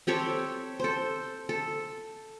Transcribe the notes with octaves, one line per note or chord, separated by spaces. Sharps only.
C4 G4 A4 C#5
A4 C5
A4